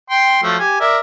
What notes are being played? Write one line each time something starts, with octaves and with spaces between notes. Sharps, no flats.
G5 C6
F3 F#3 A3
G4 G#5
A#4 D5 E5